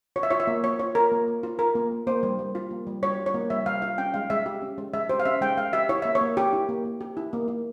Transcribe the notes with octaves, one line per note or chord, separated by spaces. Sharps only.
F4 C#5
E5
F4 C#5
E5
A#3
A#3 C#5
F4 C#5
F4 A#4
A#3
A#3
F4
F4 A#4
A#3
A#3
A#3 C5
G3
G3
F4
A#3
G3
G3 C#5
F4
C#5
A#3
G3 E5
G3 F5
F4 F5
C#4 G5
G#3 F5
G#3 E5
G4
C#4
G#3
G#3 E5
G4 C5
F5
C#4 E5
G#3 G5
G#3 F5
G4 E5
E4 C#5
A#3 E5
C#5
A#3
G4
E4
A#3
A#3
G4
E4
A#3
A#3